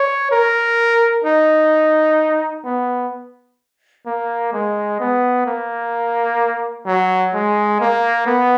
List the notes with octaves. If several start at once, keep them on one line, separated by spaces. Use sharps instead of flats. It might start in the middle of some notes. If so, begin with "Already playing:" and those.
Already playing: C#5
A#4
D#4
B3
A#3
G#3
B3
A#3
F#3
G#3
A#3
B3